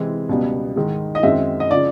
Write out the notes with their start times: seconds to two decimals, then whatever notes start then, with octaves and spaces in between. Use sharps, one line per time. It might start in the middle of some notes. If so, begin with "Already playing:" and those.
Already playing: C3 E3 G#3 C4
0.29 C#2 B2 G3 B3
0.76 G#2 D#3 G#3
1.15 D#5
1.23 F#2 D#3 G#3 C4 E5
1.60 D#5
1.71 C#3 F3 D5